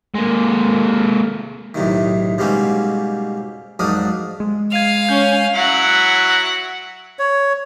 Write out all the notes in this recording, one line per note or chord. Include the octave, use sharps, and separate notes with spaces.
G#3 A#3
B1 A2 C3 D#3
G#2 B2 G3 A#3 C4 C#4
F2 G#2 F#3 D4 A#4 D#6
G#3
F5 G#6 D#7 F7
C#4 C#5 G6
F#3 E4 F#5
C#5